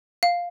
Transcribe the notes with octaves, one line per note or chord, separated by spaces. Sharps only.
F5